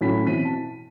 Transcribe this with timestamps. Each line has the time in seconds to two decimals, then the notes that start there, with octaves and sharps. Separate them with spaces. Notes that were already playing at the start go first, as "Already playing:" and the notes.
0.01 A2 F#3 C#4 E4 B5 B6
0.26 B2 E3 C4 B6 D#7
0.45 A5